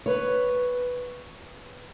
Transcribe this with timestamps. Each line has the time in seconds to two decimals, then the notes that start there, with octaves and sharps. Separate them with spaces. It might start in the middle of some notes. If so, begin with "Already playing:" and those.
0.06 B4 C#5